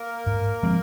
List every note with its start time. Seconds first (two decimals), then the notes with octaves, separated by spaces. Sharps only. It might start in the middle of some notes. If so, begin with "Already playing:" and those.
Already playing: A#3 A#4
0.26 G#2
0.63 F3 G#3 C4